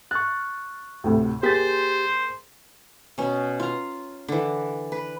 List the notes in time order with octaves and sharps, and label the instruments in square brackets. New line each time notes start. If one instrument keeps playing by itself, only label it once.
[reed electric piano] C#6 F#6 [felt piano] F6 A6
[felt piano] D2 A2 C3
[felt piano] A#3 G#4 B6 [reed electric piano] G4 A6 [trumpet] C5
[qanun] B2 C#4
F4 A#5
D3 E3
B4